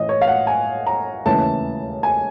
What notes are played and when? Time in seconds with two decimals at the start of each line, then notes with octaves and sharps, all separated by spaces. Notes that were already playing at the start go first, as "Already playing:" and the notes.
Already playing: A1 A2 E3 A3 D#5
0.09 C#5
0.21 F5
0.27 F#5
0.47 G#5
0.87 A#5
1.25 E1 D#2 C#3 E3 A3 A5
2.03 G#5